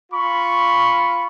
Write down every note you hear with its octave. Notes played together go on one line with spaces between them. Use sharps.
F4 B5 C#6